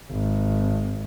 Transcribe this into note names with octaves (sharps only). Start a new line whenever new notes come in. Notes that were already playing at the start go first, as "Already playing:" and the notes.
G#1